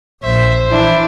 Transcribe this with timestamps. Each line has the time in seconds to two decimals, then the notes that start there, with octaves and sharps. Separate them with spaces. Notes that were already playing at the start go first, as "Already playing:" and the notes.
0.23 A#1 C5 E5
0.72 E3 D4 E4